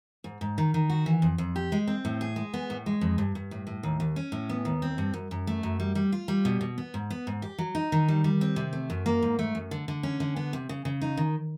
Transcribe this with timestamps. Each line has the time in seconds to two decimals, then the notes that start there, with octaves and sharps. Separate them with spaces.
0.24 G#2
0.41 G#2
0.58 D#3
0.74 D#3
0.90 F#4
1.06 E3
1.22 F2
1.38 F2
1.56 G4
1.72 G#3
1.87 C4
2.05 A2
2.21 G#4
2.36 G#3
2.54 B3
2.70 A2
2.86 G#3
3.01 F2
3.18 G2
3.35 G2
3.51 A2
3.67 A2
3.83 D#2
4.00 D#2
4.16 C#4
4.32 A2
4.49 B3
4.65 D#2
4.82 C4
4.98 G2
5.14 F#2
5.31 F#2
5.47 A3
5.63 F#2
5.80 G3
5.95 G3
6.12 F4
6.28 G3
6.45 B2
6.61 B2
6.78 B3
6.94 G#2
7.10 B3
7.27 G#2
7.42 G4
7.58 F#3
7.75 D#4
7.92 D#3
8.08 G3
8.24 G3
8.41 C4
8.56 C3
8.73 A3
8.90 F#2
9.06 A#3
9.23 G#2
9.39 A3
9.55 F#2
9.71 D3
9.88 D3
10.03 C#4
10.20 D3
10.36 B3
10.53 C3
10.69 C#3
10.85 C#3
11.02 D#4
11.17 D#3